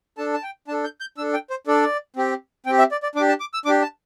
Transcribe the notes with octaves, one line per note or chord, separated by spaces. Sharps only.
D4 A4 A5
A5
G5
D4 A4 A5
G6
G6
D4 A4 E6
G5
C5
D4 A4 D5
C4 G4
C4 G4 G5
E5
D5
D5
D4 G4 D6
A5
D6
E6
D4 G4 D6
A5